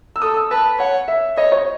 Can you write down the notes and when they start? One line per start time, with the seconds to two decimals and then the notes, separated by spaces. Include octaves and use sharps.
0.16 E6
0.22 A4 D#6
0.37 E6
0.51 B4 A5
0.79 C#5 F#5
1.08 E5
1.37 C#5 D#5
1.52 C#5